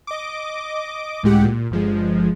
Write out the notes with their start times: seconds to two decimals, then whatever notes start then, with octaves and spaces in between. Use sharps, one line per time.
0.07 D#5 D6
1.23 C#2 A2 G#3 G4 F#5
1.44 A#2
1.71 G1 F3 G#3